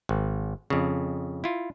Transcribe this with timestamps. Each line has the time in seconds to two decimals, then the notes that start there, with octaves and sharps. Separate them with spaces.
0.09 G#1
0.70 F2 C#3
1.44 E4 F4